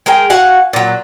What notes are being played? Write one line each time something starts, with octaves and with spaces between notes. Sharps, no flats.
G#3 G#4 A#4 G5
F#4 F5 F#5 G#5
A#2 F#3